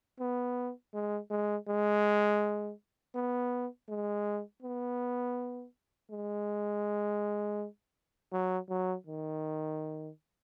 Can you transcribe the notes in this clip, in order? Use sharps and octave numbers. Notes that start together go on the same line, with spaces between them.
B3
G#3
G#3
G#3
B3
G#3
B3
G#3
F#3
F#3
D#3